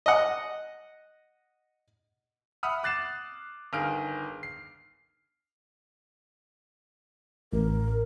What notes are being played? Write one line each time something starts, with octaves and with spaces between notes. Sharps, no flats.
D#5 F#5
E5 F#5 B5 D#6 F6
D6 F#6 A6 C7 E7
G1 D#3 G#4 F5 F6 D7
C7
A1 A#4